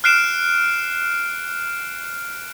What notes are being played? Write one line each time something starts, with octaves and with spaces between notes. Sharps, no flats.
F6 F#6 C7 D7 E7